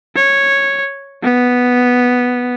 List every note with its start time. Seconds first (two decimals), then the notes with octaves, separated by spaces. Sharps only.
0.16 C#5
1.23 B3